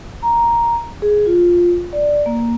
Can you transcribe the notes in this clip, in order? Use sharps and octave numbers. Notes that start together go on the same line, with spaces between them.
A#5
G#4
F4
D5
A#3